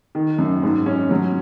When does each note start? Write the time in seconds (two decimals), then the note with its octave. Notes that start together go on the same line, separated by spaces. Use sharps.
0.15 D#3
0.38 F#2
0.63 G#2
0.86 C#4
1.11 F#3